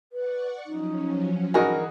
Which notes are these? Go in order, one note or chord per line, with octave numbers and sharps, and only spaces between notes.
B4 D5 F#5 C#6
F3 F#3 C#4 D#4
G2 D3 E3 C#4 D#4 F#4 G#4 A#4